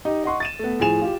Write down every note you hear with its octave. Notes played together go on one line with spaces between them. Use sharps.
D#4 G4 D#5
D#5 F#5 C6 C#6
A6 D#7 E7
A3 B3
A2 F3 G#4 G#5 E7 F7
F4 G4